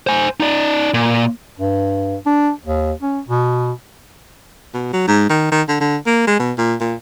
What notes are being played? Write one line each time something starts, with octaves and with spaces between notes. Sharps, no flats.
C5 G#5
D#4 D5
A#2
G2
D4
D#2
C#4
B2
B2
F#3
G#2
D#3
D#3
D3
D3
A#3
G#3
B2
A#2
A#2